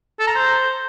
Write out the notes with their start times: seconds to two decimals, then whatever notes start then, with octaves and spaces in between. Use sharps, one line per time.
0.19 A4
0.27 A#5
0.35 C5